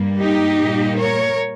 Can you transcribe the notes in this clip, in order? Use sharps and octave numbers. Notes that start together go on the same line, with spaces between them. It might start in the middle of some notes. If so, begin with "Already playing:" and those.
Already playing: G2 G3 A#3
D#4 G4
A#2 G3 A#3
A#4 C#5